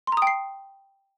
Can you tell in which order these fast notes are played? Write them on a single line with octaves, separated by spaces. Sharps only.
C6 A#5 D#6 G5 C7